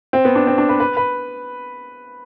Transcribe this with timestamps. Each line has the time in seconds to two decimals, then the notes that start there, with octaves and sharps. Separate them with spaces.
0.13 C4
0.25 B3
0.35 D4
0.47 C4
0.58 D4
0.69 B4
0.80 B4
0.97 B4